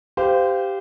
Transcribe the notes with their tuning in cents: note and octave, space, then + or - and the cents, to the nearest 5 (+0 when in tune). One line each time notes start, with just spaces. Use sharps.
G4 +0 C5 -25 F5 +0